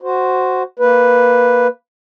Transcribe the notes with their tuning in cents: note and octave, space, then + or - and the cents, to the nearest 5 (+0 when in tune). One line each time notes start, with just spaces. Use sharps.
F#4 +0 C5 +0
A#3 +0 B4 +0